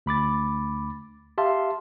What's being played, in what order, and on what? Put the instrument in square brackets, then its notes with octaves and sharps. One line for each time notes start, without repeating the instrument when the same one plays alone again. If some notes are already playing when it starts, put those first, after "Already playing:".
[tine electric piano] D2 B5 D6 A6
G4 E5 F5 A5 C6